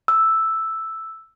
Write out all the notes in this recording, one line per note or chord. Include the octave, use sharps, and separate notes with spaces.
E6